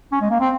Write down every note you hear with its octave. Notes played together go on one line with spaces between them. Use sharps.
C#4
G#3
A#3
C4